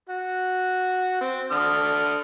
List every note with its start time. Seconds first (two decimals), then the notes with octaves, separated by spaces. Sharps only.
0.09 F#4
1.21 C4
1.51 D3 D#6 F6